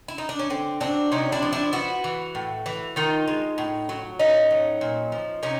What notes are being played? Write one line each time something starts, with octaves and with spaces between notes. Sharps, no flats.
E4
D#4
D4
C#4
D3 C4
F#3 C4 D4
C3 C#4 D#4
D4 E4
F3
D4 E4
B3 E4 F#4
E3
A2
E3
D#3 D#4 F4
G#3
A2
F#3
A2 C#4 D#4
F#3
A#2
F3
C3 C#4 D#4